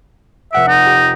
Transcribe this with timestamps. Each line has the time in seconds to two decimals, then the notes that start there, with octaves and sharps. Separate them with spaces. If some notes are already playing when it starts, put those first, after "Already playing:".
0.53 F1 E5 F#5 D7
0.68 D#4
0.86 G4